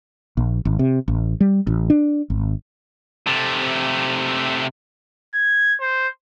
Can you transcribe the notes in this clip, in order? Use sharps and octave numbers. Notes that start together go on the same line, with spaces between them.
A#1
G#1
C3
A1
G3
A1
D4
G#1
C3 A3
G#6
C5